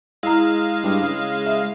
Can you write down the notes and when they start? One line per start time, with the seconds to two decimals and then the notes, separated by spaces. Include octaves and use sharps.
0.23 G#3 E4 F5 A#5
0.84 G2
1.02 C#3
1.46 E5